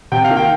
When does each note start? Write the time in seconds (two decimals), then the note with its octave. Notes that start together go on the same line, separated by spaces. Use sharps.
0.12 C3 G5
0.24 F5
0.31 D#3 A#3
0.37 G5